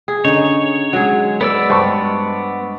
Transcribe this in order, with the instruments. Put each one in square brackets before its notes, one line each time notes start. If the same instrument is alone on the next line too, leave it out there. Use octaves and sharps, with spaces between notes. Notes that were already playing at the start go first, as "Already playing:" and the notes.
[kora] G#4
[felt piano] D3 C#4 [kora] D#4 [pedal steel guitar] C#5
[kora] F#3 G#4 [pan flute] G#3
[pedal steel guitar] B3 D5 E6 [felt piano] B4
[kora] G2 [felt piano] C5 A5 C#6